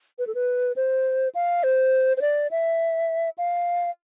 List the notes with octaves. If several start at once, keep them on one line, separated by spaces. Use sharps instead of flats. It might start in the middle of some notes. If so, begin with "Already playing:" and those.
B4
A4
B4
C5
F5
C5
C5
D5
E5
F5